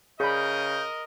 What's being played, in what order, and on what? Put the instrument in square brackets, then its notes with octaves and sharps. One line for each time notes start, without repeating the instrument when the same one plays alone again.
[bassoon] C#3 [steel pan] G#4 D5 B5 [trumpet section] A#4 D#5 [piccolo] G6